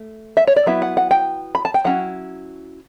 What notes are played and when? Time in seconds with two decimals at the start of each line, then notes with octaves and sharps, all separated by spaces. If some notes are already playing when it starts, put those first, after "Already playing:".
Already playing: A3
0.37 E5
0.47 C#5
0.56 D5
0.66 F#3 B3 E4 E5
0.82 F#5
0.97 F#5
1.11 G5
1.55 B5
1.65 A5
1.74 G5
1.85 F#3 C#4 E4 F#5